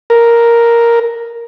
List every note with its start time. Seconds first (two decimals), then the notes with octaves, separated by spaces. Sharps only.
0.10 A#4